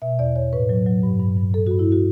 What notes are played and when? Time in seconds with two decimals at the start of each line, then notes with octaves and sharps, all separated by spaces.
0.02 B2 E5
0.19 E2 D5
0.36 E2 C#5
0.53 A2 B4
0.69 F#3
0.86 F#3
1.03 G2
1.20 G2
1.37 G2
1.54 G2 A4
1.67 F#4
1.71 G2
1.79 E4
1.92 F#4